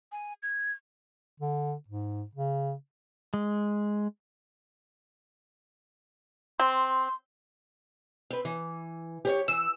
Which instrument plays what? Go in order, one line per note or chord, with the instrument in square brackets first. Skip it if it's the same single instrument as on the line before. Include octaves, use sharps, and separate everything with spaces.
[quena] G#5
G#6
[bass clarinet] D3
G#2
C#3
[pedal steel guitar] G#3
[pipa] C4 [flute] C6
[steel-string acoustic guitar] C4 B4
E3
G4 C5 C#5
[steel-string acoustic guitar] E3 [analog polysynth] E6